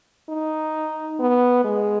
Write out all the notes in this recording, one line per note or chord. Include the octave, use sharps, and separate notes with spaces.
D#4
B3
G#3